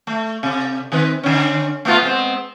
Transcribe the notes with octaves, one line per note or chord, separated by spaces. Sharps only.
A3
C3
D#3 C4 B4
D3 C#4
A3 B3 F4
G#3 B3 C4